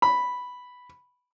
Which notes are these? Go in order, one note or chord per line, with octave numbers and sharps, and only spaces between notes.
B5